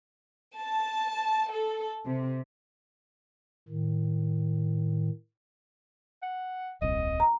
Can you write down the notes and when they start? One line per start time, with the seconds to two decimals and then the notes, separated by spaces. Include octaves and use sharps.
0.57 A5
1.51 A4
2.06 C3
3.68 A2 D#3
6.23 F#5
6.82 D#1 C2 C3 D#5
7.20 A#5